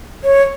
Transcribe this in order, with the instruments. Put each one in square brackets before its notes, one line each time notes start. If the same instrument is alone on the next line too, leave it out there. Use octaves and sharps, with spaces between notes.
[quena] C#5